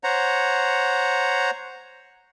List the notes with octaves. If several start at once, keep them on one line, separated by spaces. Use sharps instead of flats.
C5 C#5 F#5 A#5